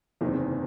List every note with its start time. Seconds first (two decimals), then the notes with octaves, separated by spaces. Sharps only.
0.21 F#1 E2 C3 D#3